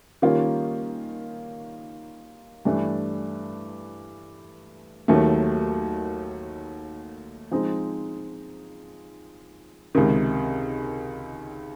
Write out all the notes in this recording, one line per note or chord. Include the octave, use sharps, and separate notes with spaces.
D#3 G3 A#3 C#4 F4
G2 E3 A3 D4
D#2 D#3 F#3 A3
F3 G#3 C4 D#4
C#2 C3 D#3